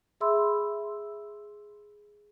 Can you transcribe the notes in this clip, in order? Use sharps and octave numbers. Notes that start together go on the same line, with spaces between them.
G#4 E5 B5 C6 E6